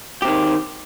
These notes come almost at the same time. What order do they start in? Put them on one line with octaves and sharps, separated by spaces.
G4 C4 D#3